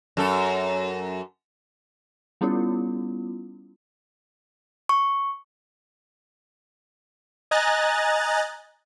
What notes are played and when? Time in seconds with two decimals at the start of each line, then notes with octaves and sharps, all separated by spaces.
0.17 F#2 A4
2.41 G3 B3 C#4 E4 F4
4.89 C#6
7.51 D#5 G#5 A#5 F#6 A6